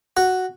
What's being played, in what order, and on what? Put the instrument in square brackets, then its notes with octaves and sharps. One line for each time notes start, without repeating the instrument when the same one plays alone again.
[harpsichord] F#4